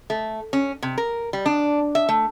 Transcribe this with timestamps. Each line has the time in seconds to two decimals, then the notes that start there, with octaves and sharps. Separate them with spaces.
0.10 A3
0.53 C#4
0.82 C3
0.98 A#4
1.33 G3
1.46 D4
1.95 E5
2.09 A3